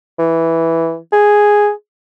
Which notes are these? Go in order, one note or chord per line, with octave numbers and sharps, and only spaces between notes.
E3
G#4